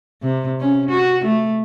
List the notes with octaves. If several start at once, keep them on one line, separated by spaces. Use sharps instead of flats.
C3
C#4
F#4
A3